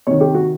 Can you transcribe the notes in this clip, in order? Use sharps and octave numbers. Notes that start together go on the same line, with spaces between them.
C3 D#3 C#5
G4
F#4